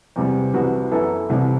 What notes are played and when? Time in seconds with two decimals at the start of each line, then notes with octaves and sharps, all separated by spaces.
0.16 E2 C3 G3
0.54 C2 C3 E3 B3 F#4
0.91 F#2 E3 B3 E4 A4
1.30 C2 C3 E3